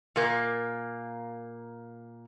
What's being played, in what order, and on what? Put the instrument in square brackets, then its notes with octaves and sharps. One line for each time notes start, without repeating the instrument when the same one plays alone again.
[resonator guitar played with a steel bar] A#2 A#3